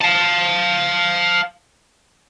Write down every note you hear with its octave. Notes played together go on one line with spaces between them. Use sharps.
F5 A5